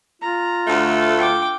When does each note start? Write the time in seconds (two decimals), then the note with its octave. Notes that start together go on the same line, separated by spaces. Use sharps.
0.22 F4 A#5
0.67 D2 A3
1.18 G5 D6